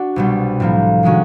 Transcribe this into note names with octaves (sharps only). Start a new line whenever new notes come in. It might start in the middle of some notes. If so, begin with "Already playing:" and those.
Already playing: D4 F#4
C2 B2 G3
A2 F3 A#3
C3 D#3 G#3 C#4 F#4